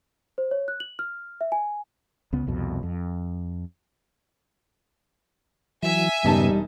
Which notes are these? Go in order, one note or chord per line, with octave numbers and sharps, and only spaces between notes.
C5
C#5
F#6
F#7
F6
E5
G#5
C#2 C#3 B3
C2 F2 B2
F2
E3 F#3 E5 G#5
E1 G2 C#3 G3 B3 D#4 A5